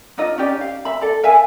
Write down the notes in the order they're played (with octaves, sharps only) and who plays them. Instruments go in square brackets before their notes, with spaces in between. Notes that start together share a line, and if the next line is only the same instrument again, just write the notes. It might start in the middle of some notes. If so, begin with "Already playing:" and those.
[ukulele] D4 D#4 F4 D#5
C#4 D#4 G4 D5
F5
E5 B5
A4 D5
A#4 E5 F5 G#5